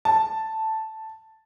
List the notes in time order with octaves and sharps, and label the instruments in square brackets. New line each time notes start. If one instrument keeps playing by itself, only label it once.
[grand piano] A5